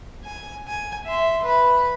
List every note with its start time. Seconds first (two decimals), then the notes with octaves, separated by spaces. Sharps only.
0.24 G#5
0.66 G#5
1.06 E5 C6
1.44 B4 B5